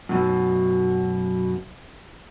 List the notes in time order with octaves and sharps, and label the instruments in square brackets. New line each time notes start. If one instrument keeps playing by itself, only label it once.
[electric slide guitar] F#2 B2